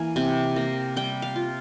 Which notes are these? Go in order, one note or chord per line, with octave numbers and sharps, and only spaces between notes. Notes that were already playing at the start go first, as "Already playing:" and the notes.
Already playing: E3 A#3 G#5
C3
A#3
G3 G5
F5
F4